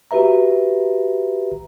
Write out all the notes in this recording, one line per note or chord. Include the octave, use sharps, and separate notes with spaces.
F#4 G4 B4 E5 A#5